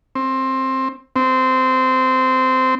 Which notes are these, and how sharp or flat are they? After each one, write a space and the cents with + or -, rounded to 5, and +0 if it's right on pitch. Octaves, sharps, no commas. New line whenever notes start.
C4 +15
C4 -15